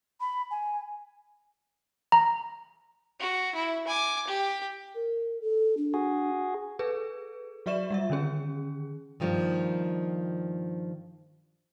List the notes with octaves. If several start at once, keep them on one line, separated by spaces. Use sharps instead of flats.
B5
G#5
A#5
F#4
E4
G#5 D6
G4
A#4
A4
D4
F#4 G#4
G#4 A4 B4
F#3 F#4 D5 E5 C#6 E7
G3 F4 E5
D3 D#3 C#4 G#4
G2 D#3 F3 A#3